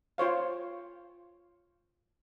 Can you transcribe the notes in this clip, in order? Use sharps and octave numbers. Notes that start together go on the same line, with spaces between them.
F4 C5 C#5 F5